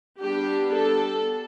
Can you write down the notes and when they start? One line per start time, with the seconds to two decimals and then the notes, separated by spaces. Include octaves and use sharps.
0.20 G3 B3 D4 G4
0.73 A4